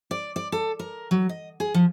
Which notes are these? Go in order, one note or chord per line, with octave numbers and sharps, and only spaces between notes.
D5
D5
A4
A#4
F#3
D#5
G#4
F3